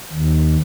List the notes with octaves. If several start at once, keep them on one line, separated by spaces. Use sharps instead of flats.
D#2